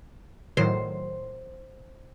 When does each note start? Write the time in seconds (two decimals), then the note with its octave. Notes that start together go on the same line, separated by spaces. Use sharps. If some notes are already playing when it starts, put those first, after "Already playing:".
0.57 A2 D#3 F#3 C5